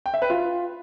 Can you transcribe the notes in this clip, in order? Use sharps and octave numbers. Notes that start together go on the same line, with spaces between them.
G5
E5
B4
F4